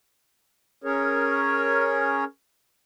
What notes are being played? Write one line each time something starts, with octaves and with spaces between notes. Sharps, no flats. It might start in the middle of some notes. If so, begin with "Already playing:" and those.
C#4 G#4 A#4 C#5